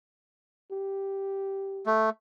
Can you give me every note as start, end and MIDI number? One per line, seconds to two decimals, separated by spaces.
0.72 1.88 67
1.86 2.10 57